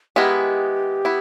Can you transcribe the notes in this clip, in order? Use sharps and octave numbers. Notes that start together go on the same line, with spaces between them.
D#3 G#3 B3 E4 G4
B3 E4